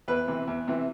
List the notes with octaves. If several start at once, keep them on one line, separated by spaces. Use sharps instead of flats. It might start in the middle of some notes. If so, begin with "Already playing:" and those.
E2 B4
C3 E3
E2
C3 E3